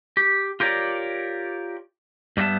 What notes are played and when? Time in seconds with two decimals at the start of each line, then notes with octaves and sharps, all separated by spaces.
0.17 G4
0.60 F4 G4 A#4 C#5 D5
2.37 G2 G3 A3 B3 E5 A5